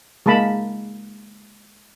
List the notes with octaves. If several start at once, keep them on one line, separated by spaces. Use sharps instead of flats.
G#3 A#3 A5 B5